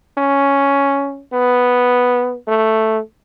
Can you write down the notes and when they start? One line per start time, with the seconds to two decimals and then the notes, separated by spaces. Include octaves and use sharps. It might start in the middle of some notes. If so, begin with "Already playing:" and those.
0.18 C#4
1.33 B3
2.48 A3